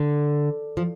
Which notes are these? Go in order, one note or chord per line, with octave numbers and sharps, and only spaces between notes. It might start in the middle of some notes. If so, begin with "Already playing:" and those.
Already playing: D3
F3